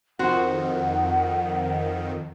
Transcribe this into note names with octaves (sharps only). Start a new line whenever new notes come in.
F2 D#3 F#4 C5 F#5